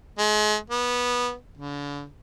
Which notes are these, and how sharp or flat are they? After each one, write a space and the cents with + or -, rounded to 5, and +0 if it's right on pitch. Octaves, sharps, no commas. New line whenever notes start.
G#3 +35
B3 -15
D3 -40